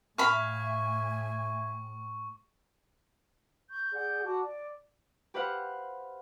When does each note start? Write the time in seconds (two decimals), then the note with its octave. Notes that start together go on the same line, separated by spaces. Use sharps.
0.18 A2 E5 F5 G#5 B5 C#6
3.70 C#6 G6
3.93 G#4 D5 F#5 G6
4.24 F#4 A5 D6
4.44 D5
5.34 G4 B4 C5 F5 F#5